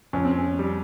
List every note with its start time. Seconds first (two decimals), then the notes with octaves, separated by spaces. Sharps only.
0.13 F2 C#4
0.25 C4
0.37 C#4
0.59 G3